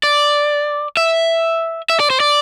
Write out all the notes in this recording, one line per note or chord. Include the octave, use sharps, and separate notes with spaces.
D5
E5
E5
D5
C5
D5